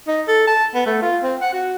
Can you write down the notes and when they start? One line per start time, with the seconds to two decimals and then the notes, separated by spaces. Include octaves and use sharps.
0.08 D#4
0.28 A4
0.47 A5
0.75 B3
0.87 A3
1.02 F4
1.23 C4
1.42 F#5
1.53 F#4